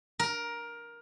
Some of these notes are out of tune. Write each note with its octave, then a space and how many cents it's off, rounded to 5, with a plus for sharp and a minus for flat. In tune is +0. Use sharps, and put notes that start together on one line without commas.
A#4 +15